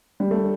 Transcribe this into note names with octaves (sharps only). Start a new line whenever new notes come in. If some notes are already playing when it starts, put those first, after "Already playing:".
G3
A3